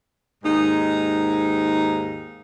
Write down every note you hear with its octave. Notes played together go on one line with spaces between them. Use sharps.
D#2 G#2 D#4